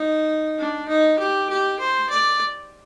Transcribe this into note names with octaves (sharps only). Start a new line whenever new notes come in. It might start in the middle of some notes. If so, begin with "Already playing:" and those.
Already playing: D#4
D4
D#4
G4
G4
C5
D5